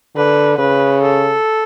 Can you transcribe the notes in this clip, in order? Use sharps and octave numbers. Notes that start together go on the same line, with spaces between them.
D3 B4
C#3 B4
A4